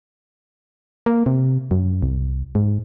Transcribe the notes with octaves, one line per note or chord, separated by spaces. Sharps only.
A#3
C3
F#2
C2
G#2